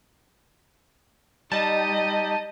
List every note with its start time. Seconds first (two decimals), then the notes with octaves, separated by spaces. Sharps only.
1.52 G3 D#4 G4 D#5 A5